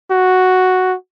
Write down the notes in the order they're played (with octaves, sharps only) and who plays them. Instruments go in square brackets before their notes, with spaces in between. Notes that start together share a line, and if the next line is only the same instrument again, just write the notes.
[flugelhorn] F#4